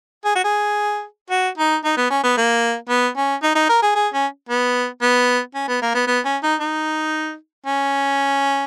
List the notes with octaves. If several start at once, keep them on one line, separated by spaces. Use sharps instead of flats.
G#4
F#4
G#4
F#4
D#4
D#4
B3
C#4
B3
A#3
B3
C#4
D#4
D#4
A#4
G#4
G#4
C#4
B3
B3
C#4
B3
A#3
B3
B3
C#4
D#4
D#4
C#4